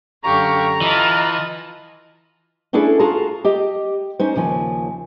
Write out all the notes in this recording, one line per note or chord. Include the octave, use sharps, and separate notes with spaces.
F#2 D3 G4 F5 A#5 C#6
E3 F4 D#5 A5
A3 C#4 D4 E4 G#4 A4
F4 F#4 G#4 F5 A5 A#5
G4 D#5
C#4 D#4 C5
D#2 C#3 F3 G#5